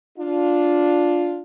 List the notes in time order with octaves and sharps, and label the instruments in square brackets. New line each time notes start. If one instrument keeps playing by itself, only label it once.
[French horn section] D4 F4